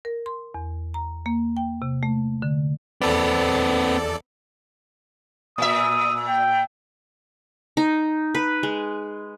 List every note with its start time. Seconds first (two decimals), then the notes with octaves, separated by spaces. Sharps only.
0.05 A#4
0.26 C6
0.54 E2
0.94 A#5
1.26 A#3
1.57 G5
1.82 C3
2.03 A3
2.42 D3
3.01 E2 C4 A4 B4 D5
5.58 A#2 E5 D#6
6.28 G5
7.77 D#4
8.35 B4
8.63 G#3